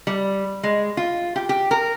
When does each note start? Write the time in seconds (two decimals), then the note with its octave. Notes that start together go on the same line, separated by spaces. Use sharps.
0.07 G3
0.63 G#3
0.97 F4
1.36 G4
1.49 G4
1.71 A#4